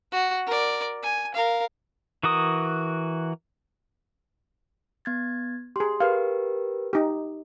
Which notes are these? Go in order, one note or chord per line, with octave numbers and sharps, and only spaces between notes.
F#4
A#4 D5
G#5
A#4 F5
E3 F#4 A#4 D#6
B3 G#6 A6
G4 G#4 C6
G4 A#4 B4 F5
D#4 G4